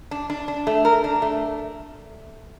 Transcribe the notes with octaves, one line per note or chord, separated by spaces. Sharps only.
D4
D4
D4
A3
A#4
D4
A3